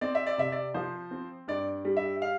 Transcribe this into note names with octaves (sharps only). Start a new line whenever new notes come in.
C4 D5
E5
D5
C3 E5
D5
F3 C5
C4
G2 D5
G3
E5
F5